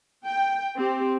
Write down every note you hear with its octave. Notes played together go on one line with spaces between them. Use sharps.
G5
C4 G4